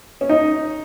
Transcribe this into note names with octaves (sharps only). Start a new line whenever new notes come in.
C#4
D#4